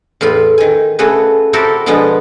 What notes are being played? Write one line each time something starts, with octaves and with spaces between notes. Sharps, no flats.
E2 A2 F4 B5
D#3 G#5
C#3 A3 F#4 G#4 B4
C4 E4 F#4 G4 A4 A#4
B2 D3 F3 G#3 B3